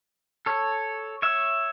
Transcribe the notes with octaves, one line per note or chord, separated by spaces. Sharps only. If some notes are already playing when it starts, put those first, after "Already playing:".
A4 C#5
C#5 E5